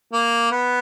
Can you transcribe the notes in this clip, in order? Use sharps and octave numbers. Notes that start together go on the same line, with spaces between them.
A#3
B3